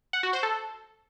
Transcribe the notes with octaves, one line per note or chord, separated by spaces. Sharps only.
F#5
F#4
C5
A4